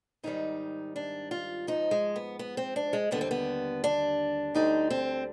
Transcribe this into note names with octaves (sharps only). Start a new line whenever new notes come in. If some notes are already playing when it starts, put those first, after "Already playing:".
G#2 D#3 G3 D#4
D4
F4
G#2 F3 D#4
G#3
B3
B3
C4
D4
G#3
D#2 D3 G3 B3
C4
B3
D4
D2 D3 G3 D#4
C4